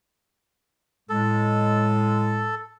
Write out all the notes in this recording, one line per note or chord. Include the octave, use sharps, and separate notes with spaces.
A2 G#3 A4